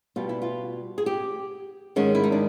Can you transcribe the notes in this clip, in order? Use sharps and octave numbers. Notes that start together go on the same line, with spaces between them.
B2 G3 F4
E4
F4
G#4
G4
G#2 D#3 G#3 C#4
E4
D#4
D4